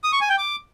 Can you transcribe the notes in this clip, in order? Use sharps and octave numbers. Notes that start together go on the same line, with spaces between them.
D#6
C#6
G#5
G5
D6